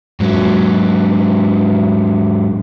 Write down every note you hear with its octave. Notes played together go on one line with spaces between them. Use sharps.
G#2 F#3